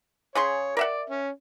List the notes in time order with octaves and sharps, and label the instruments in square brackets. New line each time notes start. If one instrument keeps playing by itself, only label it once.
[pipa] C#3 G#4 C6 [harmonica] C#5
[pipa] A#4 E5 F#5 [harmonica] D5
[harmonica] C#4